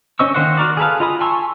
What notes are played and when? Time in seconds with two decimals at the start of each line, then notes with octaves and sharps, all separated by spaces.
0.19 C#4 C5 D#5 C#6 E6
0.34 D#3 A#3 C5 D#5 F#5
0.57 F#4 A#4 D5
0.77 G#4 A4 B4 F5
1.00 F4 D#5 G#5 B5 D#6
1.21 G#5 A5 C6 C#6 E6